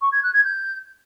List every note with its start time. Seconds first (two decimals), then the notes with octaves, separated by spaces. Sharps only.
0.01 C#6
0.12 G#6
0.23 F#6
0.33 G#6
0.44 G6